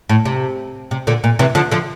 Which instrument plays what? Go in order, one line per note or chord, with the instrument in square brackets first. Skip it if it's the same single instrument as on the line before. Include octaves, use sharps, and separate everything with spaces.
[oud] A2
C3
C3
A#2 D3
A#2
C3 E3
D3 F3
D3 F3